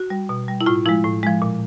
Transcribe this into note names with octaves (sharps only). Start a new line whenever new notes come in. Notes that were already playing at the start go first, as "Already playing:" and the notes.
Already playing: F#4
G3
B2
G3
E4
A2 F4
F3 G#3 E4
A2
F3 G#3
A#2